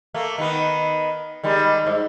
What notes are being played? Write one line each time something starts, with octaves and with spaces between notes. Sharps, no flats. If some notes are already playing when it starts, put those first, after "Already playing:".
A3 A#3
D#3 B3
D#3 G3 G#3
G#2